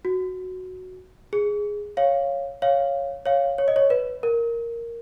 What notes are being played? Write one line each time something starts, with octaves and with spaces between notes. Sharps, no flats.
F#4
G#4
C#5 F5
C#5 F5
C#5 F5
C#5
D#5
C#5
B4
A#4